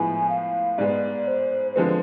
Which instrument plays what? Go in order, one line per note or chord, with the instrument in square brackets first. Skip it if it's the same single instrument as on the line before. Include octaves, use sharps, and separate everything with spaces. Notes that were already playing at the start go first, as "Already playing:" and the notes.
Already playing: [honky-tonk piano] A2 F3 G#3 B3 E4 [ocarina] G#5
[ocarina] F5
[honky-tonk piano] G#2 G#3 B3 [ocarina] D5
[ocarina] C5
C5
[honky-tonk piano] D3 F3 G#3 C4 [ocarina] B4